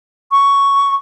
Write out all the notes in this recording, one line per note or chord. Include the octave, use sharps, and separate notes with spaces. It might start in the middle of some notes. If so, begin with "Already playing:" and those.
C#6